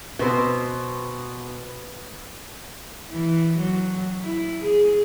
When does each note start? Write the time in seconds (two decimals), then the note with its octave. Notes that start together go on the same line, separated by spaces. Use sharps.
0.19 B2 B3 C4 C5
3.11 E3
3.57 F#3
4.22 E4
4.63 G#4